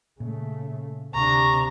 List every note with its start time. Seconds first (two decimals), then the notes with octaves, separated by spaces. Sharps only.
0.20 A#2 C#3 A3
1.14 D1 C3 D4 A#5 C#6